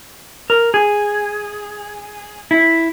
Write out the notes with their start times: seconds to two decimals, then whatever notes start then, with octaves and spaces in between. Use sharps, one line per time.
0.50 A#4
0.74 G#4
2.51 E4